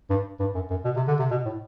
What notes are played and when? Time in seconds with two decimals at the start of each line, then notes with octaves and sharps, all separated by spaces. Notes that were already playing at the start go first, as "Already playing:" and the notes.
0.10 G2
0.40 G2
0.55 F#2
0.70 F#2
0.85 B2
0.96 C3
1.07 D3
1.19 C3
1.31 B2
1.46 A2